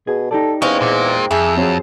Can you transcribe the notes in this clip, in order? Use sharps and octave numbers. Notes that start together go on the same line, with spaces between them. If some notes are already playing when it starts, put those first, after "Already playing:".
B2 G#4
D#4 G4 A4 D5
E2 G#3 A#3 C4 C#4
A#2
F2 G#4 E5
F#3 C4 G#4